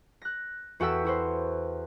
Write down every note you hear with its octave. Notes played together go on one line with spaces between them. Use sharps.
F#6 A#6
E2 F#4 A4 G5 E6 B6
E4 F#4 C5